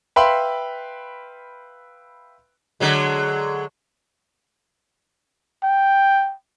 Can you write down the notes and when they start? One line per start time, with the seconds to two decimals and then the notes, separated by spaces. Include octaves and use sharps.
0.16 B4 E5 F5 G5 B5 C6
2.80 D3 F#3 G#3
5.63 G5